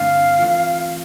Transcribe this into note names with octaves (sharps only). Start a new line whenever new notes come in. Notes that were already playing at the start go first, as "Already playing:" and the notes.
Already playing: G2 D3 A3 C4 F5
E3 A3 C4 F4